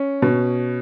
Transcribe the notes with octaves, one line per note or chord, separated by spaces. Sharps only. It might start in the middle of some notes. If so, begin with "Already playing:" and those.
Already playing: C#4
B2